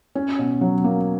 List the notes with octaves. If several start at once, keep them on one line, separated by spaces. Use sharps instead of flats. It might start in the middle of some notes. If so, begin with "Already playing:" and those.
C#4
B2
F#3
A#3